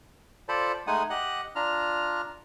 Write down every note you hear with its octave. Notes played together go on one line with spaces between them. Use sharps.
F4 A4 C5 D5 A5 B5
G#3 A3 D#4 F#5 G#5 D#6
G4 D#5 F#5 F#6
D4 F4 A#5 F6